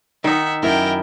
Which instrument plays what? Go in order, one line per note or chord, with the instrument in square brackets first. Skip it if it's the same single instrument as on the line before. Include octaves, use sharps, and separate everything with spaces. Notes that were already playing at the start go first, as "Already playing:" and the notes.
[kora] D#3 D#4 [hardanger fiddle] E5 F#5
[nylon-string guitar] F#2 E4 [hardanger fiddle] A#4 G5